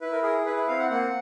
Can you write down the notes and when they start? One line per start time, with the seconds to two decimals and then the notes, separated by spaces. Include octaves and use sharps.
0.01 E4 B4
0.12 A#4
0.23 G#4 A#4
0.46 E4 B4
0.57 B4
0.68 C4 F5
0.79 F#5
0.90 A#3 F#5